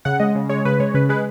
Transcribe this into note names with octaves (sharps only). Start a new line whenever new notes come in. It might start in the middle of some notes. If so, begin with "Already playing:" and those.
C#3 F#5
G#3 D#5
C#3
G#3 C#5
C#3 B4
G#3 C#5
C#3 B4
G#3 B4